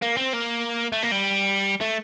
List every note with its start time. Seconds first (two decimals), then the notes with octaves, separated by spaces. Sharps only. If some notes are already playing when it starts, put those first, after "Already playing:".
0.02 A#3
0.17 C4
0.33 A#3
0.92 A3
1.03 A#3
1.11 G3
1.81 A3